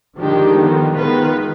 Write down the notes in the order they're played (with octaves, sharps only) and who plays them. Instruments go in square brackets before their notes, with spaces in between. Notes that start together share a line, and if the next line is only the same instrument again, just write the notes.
[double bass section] D#3 [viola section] F3 G#3 D4 G4
[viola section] D3 F3 B3
[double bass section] D#3 [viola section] G#3 B3 F4 B4